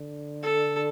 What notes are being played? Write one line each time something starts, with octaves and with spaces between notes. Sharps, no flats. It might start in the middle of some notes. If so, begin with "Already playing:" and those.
Already playing: D3
A4